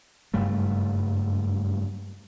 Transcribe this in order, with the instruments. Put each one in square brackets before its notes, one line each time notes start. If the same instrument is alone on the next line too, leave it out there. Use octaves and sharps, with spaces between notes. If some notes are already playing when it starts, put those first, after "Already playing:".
[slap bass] F#1 G2 G3 A3